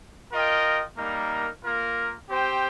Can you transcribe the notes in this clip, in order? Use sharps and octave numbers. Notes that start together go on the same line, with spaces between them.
F4 A#4 D#5 G5
G3 A#3 D#4 A#4
A#3 F4 A#4
C4 G4 C5 G5